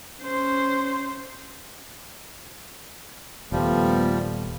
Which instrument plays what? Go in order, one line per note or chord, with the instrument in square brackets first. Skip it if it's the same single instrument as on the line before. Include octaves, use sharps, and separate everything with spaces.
[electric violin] C#4 C5
[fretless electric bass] D#1 [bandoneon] F3 G3 [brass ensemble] A3 B3